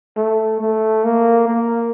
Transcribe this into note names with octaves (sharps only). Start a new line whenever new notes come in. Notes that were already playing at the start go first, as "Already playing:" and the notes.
A3
A3
A#3
A#3